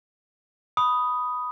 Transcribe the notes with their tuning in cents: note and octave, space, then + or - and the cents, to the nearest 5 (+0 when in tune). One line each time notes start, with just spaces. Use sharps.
B5 +0 D#6 +0